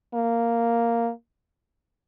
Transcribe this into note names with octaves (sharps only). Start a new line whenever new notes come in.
A#3